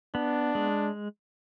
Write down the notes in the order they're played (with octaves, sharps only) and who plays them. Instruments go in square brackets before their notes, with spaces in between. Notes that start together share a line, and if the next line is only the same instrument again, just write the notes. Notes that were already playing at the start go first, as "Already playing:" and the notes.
[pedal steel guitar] B3 [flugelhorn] D4
[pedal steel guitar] G#3